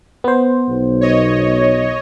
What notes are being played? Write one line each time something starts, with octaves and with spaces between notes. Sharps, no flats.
B3 C5
B1
C#5 D#5